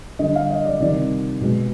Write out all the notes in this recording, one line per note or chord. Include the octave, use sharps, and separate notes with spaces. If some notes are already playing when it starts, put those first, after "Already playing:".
D3 G3 D#5
F5
D#5
D5
C3 D#3 G3 D5
B2 G#3